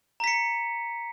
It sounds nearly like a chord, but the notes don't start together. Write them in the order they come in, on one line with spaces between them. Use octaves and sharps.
A#5 B6 C#7